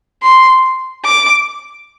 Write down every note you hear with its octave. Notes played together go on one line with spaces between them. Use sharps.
C6
D6